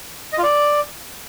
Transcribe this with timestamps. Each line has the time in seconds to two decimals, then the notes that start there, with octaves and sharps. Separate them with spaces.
0.33 D#5
0.38 F4
0.43 D5